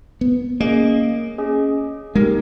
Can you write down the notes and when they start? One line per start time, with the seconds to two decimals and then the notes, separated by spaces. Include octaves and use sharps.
0.21 B3
0.60 A#3 C#4 G#4 D#5
1.38 C#4 G#4 D#5
2.15 G#3 A#3 D#4 G4 A#4